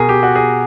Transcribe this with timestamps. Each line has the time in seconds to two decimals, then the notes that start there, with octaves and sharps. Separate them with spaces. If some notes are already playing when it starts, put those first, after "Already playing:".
Already playing: B2 G#4 A#4
0.09 G4
0.23 F#4
0.36 G#4